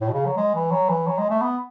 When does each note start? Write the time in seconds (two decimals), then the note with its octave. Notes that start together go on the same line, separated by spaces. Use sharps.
0.01 A2
0.09 B2
0.13 C#3
0.26 F#3
0.37 G#3
0.55 E3
0.71 F#3
0.89 E3
1.07 F#3
1.18 G#3
1.30 A3
1.41 B3